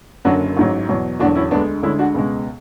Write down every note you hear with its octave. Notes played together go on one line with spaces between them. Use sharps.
F#1 F#2 D3 F#3 D4 F#4
A1 G#2 F#3
E2 B2 F#3
E1 E2 D3 F#3 D4 F#4
C#4 E4
D2 D3 G#3 B3 D4
D2 D3 G#3 C#4 E4
D4 F#4
C#2 B2 G#3